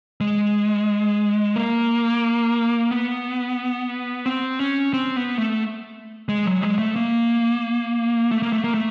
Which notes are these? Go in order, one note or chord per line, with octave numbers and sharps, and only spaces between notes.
G#3
A#3
B3
C4
C#4
C4
B3
A3
G#3
F#3
G#3
A3
A#3
A3
A#3
A3
A#3
A3